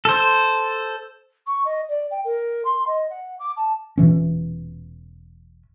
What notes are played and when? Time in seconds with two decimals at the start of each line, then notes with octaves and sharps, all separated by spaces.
0.05 A4 C5
1.46 C#6
1.65 D#5
1.88 D5
2.10 G5
2.24 A#4
2.64 C6
2.87 D#5
3.09 F#5
3.39 D6
3.56 A5
3.98 E1 A#2 E3 C#4